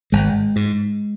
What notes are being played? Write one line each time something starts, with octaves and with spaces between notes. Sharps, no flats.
G#1 G#3
G#2